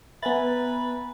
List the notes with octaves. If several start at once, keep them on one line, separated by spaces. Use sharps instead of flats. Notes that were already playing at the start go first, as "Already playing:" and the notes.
B3 B4 E5 G#5 A#5 A6